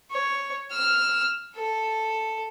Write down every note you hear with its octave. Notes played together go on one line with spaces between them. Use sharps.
C#5
E6 F6
A4